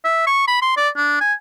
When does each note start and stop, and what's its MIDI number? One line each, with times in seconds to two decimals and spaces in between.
0.05 0.23 76
0.27 0.44 85
0.48 0.57 83
0.62 0.76 84
0.77 0.89 74
0.96 1.17 62
1.20 1.34 80